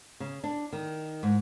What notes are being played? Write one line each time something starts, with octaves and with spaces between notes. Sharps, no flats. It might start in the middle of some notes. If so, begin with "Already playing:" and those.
C#3
D4
D#3
G#2